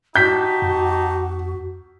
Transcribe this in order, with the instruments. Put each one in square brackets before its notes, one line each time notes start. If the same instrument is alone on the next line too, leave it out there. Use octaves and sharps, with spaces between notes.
[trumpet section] D#4 G4 A5 [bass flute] F#4 [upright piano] G6 B6
[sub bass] F2